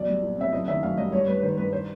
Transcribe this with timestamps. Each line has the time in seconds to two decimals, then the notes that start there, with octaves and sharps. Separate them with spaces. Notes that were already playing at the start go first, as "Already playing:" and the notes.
Already playing: B1 D5
0.08 G3
0.22 A#2
0.38 C4 E5
0.52 F#1 D#5
0.67 D#3 E5
0.83 F#2 F5
0.98 G3 D#5
1.12 G2 C#5
1.27 G3 B4
1.38 B4
1.43 D#3 C5
1.57 G2 B4
1.73 C5